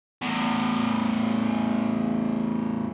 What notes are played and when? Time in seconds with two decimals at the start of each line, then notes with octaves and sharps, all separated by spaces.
0.22 E2 A2